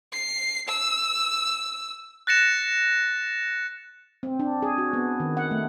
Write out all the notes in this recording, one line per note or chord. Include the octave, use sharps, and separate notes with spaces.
C7
E6
F#6 A6 A#6 C#7 E7
C4
D4
G#4
F#4
B3
D#3
F#5
A3